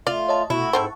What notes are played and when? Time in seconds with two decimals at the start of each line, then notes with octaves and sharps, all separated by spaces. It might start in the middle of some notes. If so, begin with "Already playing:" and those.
0.07 A3 F4 D5
0.28 C#5 D#5 A5
0.50 B2 A3 E4 F#4
0.73 G#2 A3 C4 C5 F#5 A5 C#6